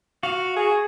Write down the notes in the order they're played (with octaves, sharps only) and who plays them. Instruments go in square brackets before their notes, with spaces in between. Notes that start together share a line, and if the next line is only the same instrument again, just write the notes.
[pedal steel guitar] F#4 [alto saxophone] F5
[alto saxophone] G#4